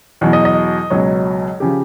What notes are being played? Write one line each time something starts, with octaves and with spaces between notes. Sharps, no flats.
E2 B2 F#3
D#5
D#5
C#2 B2 F#3 C#5
C#3 F3 G4